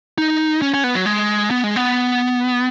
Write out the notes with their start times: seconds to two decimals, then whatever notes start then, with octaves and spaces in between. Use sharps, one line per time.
0.18 D#4
0.62 C#4
0.74 C#4
0.84 B3
0.95 F#3
1.06 G#3
1.51 B3
1.64 G#3
1.76 B3